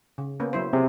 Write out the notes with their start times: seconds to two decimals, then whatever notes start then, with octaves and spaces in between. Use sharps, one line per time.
0.18 C#3
0.40 A#3 B3 C#4
0.53 F#3 E4 C5
0.73 C3 G#4